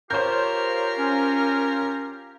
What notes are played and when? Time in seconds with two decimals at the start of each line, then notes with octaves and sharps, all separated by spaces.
0.11 F4 G4 A#4 C5 C#5 F5 G6
0.99 C#4